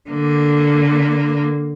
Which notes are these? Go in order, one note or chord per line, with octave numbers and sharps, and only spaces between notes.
D3 A#3